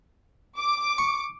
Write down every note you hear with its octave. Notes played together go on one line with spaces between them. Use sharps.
D6
C#6